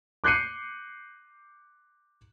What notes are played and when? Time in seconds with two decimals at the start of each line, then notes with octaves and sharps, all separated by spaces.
0.24 D6 F#6 G6 C7 C#7 D#7